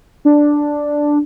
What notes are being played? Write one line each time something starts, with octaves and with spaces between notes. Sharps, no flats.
D4